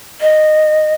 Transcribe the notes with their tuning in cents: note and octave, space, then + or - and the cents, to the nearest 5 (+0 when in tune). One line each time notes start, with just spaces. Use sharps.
D#5 -15